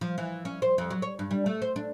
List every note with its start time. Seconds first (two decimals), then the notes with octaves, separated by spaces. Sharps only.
0.01 F3
0.18 E3
0.45 C#4
0.62 C5
0.78 F2
0.91 F#3
1.02 C#5
1.19 G2
1.31 G3
1.46 A3
1.62 C5
1.76 D4